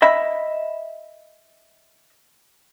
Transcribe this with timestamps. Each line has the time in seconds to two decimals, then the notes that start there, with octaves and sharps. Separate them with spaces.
0.02 D#5 E5 B5